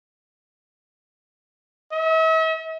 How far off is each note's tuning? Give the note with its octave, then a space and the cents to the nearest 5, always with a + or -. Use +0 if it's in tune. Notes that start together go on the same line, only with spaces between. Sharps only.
E5 -45